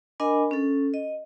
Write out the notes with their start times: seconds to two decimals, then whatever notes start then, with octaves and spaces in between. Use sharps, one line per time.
0.20 D4 A#4 D#5 G#5 B5
0.51 C#4 A4
0.94 D#5